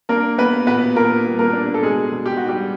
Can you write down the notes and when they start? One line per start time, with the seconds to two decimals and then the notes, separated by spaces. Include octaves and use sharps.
0.09 A#3 D4 A#4
0.38 A#3 B3 B4
0.67 A#2 B3 B4
0.96 A#2 A#3 A#4
1.25 G3
1.39 A#3 A#4
1.53 D4
1.74 A4
1.82 B2 G#3 G#4
2.12 B2
2.26 G4
2.37 D#4 F#4
2.49 G3 G4